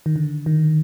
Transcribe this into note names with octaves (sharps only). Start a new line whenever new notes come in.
D#3
D3
D#3